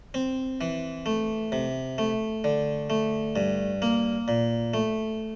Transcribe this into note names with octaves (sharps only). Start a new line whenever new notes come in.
C4
E3
A3
C3
A3
D3
A3
G2
A#3
A#2
A3